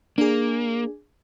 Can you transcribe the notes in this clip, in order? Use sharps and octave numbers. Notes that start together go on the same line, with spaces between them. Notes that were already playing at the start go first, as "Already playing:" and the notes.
A#3 D4 G#4